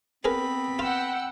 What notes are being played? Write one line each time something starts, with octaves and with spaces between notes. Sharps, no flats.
B3 C4 G#4 A#4 B4 B5
F4 F#5 G5 E6